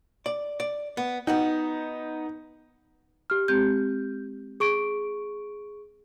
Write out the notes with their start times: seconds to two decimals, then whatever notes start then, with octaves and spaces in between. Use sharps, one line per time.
0.26 D5
0.60 D5
0.97 B3
1.27 B3 D#4 F#4 G5
3.30 G4 F6
3.48 G#3 C4 G4 G6
4.60 G#4 C#6 D7